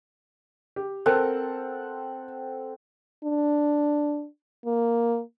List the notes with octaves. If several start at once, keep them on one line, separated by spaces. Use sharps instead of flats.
G4
C4 A4 A#4 F#5
D4
A#3